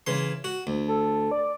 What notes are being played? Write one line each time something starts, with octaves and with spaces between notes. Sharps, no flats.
C#3 E3 C6
F#4
D2
A4
D5